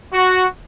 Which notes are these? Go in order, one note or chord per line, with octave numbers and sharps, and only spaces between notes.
F#4